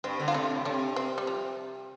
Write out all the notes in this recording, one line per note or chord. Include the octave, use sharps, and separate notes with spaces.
G2 C4
D3
F4
C3 A3 D4
A2
C3 A3 D4
C4
G3
F3